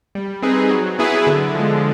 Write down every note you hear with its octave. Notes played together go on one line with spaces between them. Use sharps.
G3
C4 D#4 G#4 B4
F#3
B3 E4 G#4 B4
D3
F3 G#3